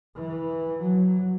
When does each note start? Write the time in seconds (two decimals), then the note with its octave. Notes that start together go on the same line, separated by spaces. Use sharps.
0.16 E3
0.80 F#3